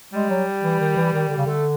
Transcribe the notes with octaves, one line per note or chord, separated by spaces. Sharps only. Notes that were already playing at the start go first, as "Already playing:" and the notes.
G3 G#3
F#3
E3
D#3
E3
D#3
D3
C#3
D3 A3